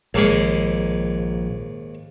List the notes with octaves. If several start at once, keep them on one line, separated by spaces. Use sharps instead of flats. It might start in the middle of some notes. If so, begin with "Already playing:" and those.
A#1 D#2 G#2 C#3